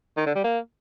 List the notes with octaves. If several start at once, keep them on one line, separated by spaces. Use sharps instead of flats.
D#3
D3
G3
A#3